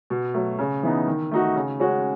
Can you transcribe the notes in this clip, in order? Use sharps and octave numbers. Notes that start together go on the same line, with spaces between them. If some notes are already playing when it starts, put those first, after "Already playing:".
B2
F#3 A3
C#3
E3 B3 D#4
D#3
A3 D#4 F#4
C#3
G#3 C#4 F#4